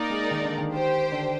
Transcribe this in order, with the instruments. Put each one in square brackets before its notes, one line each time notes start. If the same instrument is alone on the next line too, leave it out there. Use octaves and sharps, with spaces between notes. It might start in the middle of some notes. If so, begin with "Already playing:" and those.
Already playing: [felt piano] A#3 [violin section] D#4 A#4 D5
[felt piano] G#3
D#3
D3
D#3
[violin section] G4 C5 G5
[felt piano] D3